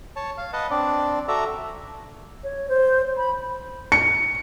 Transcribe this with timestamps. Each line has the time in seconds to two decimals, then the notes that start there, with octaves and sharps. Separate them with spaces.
0.16 C#5 A5
0.37 F5
0.53 B4 D#5 F#5 A5
0.70 C4 D4 D5
1.28 F#4 A4 D5 E5 A#5
2.44 C#5
2.69 C5
3.17 B5
3.92 C#7